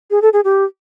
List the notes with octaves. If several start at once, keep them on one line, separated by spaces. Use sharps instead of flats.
G#4
A4
G#4
G4